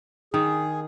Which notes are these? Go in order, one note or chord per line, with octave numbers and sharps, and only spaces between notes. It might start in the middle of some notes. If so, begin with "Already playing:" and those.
D#3 G#4